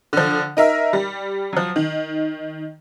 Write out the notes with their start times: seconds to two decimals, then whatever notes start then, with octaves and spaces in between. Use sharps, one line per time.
0.13 D3 F3
0.57 D#4 A#4 E5
0.93 G3
1.53 F3 F#3
1.76 D#3